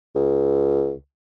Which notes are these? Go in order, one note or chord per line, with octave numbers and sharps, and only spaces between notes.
C#2